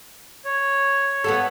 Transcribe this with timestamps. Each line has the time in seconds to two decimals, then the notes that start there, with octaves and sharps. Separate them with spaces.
0.45 C#5
1.24 B3 F#4 A4